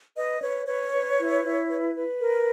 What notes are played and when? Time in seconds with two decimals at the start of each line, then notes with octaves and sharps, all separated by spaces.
0.16 B4 D#5
0.41 B4 C#5
0.67 B4 C#5
0.92 B4
1.18 E4
1.44 E4
1.69 B4
1.96 B4
2.21 A#4